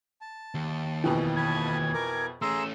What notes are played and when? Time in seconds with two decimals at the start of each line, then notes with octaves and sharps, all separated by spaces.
0.21 A5
0.55 D#2
1.04 F2 B2 E3
1.36 A5 B5 D#6 G#6
1.94 A#4 D6
2.42 A3 C#4 G#4 A#5 C6 E6